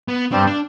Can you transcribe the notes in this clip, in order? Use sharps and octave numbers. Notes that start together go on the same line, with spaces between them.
B3
G2 G3 C4
D4